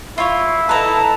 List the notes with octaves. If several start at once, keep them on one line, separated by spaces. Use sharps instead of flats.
E4 F4 C#5
A4 B4 D#5 A5 A#5